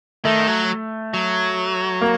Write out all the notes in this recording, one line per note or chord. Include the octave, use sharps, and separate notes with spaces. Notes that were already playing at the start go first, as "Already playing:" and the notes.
D#3 A3
F#3
F#3
A#3